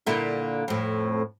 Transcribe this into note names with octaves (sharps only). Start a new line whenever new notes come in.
A#2 D3 E4
F2 A2